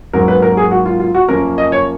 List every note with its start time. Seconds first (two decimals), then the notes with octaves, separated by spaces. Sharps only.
0.13 G#2 F#3 A#3 C#4 A#4
0.28 B4
0.42 A#4
0.57 G#4
0.71 F#4
0.86 F4
1.00 F4
1.15 F#4
1.28 F#2 F3 A#3 C#4 A#4
1.58 D#5
1.72 C#5